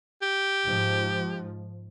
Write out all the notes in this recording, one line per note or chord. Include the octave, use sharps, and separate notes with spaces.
G4
G#2 F3